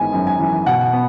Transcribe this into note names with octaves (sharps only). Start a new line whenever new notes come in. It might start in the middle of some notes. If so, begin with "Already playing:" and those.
Already playing: G#1 E3 B3 G#5
F#2
G#5
E3
B2 F#5
B3